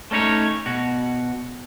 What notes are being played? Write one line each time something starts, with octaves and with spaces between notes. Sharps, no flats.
A3 C#4 D#4 E4 C#5
B2 F#4